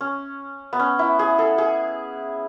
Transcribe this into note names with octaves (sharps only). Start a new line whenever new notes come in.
C#4
B3
C#4
E4
G#4
A4
G#4